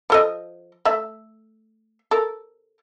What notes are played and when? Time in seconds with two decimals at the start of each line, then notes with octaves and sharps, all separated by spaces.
0.10 F3 A4 D#5
0.85 A3 E5
2.11 A4 A#4